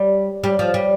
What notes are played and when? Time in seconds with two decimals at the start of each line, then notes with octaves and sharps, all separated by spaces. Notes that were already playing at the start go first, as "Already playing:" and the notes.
Already playing: G3
0.44 G3
0.59 F3
0.74 G3